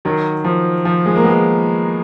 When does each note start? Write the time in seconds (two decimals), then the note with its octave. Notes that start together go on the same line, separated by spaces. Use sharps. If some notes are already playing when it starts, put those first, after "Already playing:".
0.05 D#3 F#3
0.44 F3
0.85 F3
1.06 G#3
1.16 A#3
1.24 G#3 B3